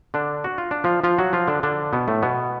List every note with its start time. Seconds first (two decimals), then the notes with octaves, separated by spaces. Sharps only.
0.14 D3 D4
0.44 F#4
0.58 F4
0.71 D4
0.84 F3 F4
1.04 F3 F4
1.19 F#3 F#4
1.33 F3 F4
1.48 D3 D4
1.63 D3 D4
1.93 B2 B3
2.08 A2 A3
2.23 B2 B3